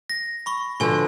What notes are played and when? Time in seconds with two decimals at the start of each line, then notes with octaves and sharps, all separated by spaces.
0.10 A#6
0.46 B5 C#6
0.80 B2 D3 F3 G#5 C#6